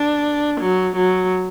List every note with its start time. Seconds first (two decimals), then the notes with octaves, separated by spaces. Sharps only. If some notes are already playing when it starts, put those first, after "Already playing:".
Already playing: D4
0.61 F#3
0.97 F#3